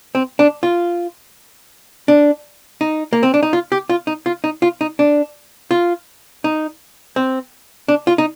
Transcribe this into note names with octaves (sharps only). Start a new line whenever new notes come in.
C4
D4
F4
D4
D#4
A#3
C4
D4
D#4
F4
G4
F4
D#4
F4
D#4
F4
D#4
D4
F4
D#4
C4
D4
F4
D#4